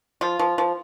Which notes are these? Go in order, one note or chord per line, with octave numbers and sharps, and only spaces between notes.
F3 F4
F3
F3